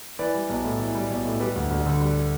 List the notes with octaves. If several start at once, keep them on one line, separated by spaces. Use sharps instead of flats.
E3 B4 D5
G3
B1
A2
E3
G3
B1
A2
G3 G4 B4
D2
D2
D3
G3